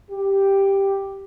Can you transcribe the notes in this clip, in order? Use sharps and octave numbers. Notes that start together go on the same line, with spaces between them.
G4